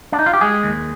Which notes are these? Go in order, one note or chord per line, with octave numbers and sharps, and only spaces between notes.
D4
D#4
F4
G4
G#3 G#4
D#2